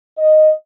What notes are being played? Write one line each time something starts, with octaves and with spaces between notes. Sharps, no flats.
D#5